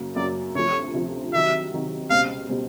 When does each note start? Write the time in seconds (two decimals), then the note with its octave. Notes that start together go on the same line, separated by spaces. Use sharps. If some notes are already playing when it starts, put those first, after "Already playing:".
Already playing: F#2 C#3 F#3 A#3
0.16 F#2 C#3 F#3 A#3 D5
0.55 D2 C3 F3 C#5
0.94 D2 C3 F3
1.33 C3 D#3 F#3 E5
1.72 C3 D#3 F#3
2.10 C#2 B2 G3 C4 F5
2.49 B2 G3 C4